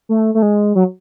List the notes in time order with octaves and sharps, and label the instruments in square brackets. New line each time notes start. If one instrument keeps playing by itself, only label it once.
[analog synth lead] A3
A3
G#3
F#3